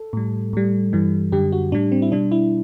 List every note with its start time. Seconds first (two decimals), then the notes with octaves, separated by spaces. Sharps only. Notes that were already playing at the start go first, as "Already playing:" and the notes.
Already playing: A4
0.13 A2 G3
0.53 A2 G3
0.93 G2 E3 G3
1.32 F#2 D3 G3 G4
1.52 F#4
1.72 A2 G3 D4
1.92 C4
2.02 E4
2.12 B2 G3 D4
2.32 E4